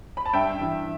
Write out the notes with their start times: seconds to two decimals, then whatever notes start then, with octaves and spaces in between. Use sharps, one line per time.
0.17 B5
0.25 A5
0.33 G2 E5 G5
0.61 E3